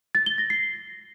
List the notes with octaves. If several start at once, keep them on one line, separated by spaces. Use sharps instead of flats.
A6
G7
A#6
C7